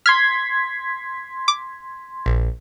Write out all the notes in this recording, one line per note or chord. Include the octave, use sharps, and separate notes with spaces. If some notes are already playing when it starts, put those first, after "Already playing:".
C6 F6 G#6 B6
D6
A#1